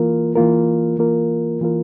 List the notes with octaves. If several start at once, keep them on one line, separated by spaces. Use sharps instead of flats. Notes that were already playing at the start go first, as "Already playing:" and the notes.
Already playing: E3 A#3 F4 A#4
E3 A#3 F4 A#4
E3 A#3 F4 A#4
E3 A#3 F4 A#4